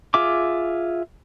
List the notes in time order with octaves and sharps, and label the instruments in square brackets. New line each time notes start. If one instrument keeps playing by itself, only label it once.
[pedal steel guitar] F4 G#4 E5 D6